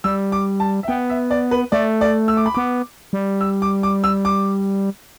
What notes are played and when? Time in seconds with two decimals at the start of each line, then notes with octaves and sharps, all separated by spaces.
0.04 G3 E6
0.32 D6
0.60 A5
0.83 E5
0.88 B3 G5
1.10 E5
1.31 D5
1.51 B4
1.72 A3 D5
2.01 D5
2.28 E6
2.37 D6
2.46 B5
2.54 B3 D6
3.13 G3
3.41 E6
3.62 D6
3.83 D6
4.04 E6
4.25 D6